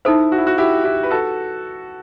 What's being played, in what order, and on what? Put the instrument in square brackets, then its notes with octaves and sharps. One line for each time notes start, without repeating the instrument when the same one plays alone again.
[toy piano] D#4 A4 C5 [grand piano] E4
[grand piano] F#4
E4
F#4
E4 G4
E4 G4
B4
F#4 A4